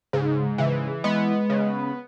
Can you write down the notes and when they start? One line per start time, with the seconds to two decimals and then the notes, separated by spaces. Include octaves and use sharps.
0.13 G#2 C#3
0.58 C#3 E3
1.04 G#3 B3
1.50 C#3